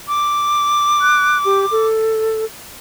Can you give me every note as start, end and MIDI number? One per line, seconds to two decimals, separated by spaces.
0.08 1.87 86
1.01 1.38 90
1.45 1.66 67
1.71 2.45 69